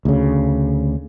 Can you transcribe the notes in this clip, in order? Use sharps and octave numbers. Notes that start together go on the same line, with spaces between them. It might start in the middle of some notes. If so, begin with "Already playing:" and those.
D2 C#3